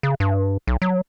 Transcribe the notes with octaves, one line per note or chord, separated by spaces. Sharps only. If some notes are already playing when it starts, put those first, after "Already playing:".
C#3
G2
B1
F#3